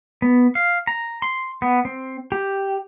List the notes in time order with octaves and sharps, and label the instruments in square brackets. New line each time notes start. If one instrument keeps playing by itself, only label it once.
[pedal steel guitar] B3
F5
A#5
C6
B3
C4
G4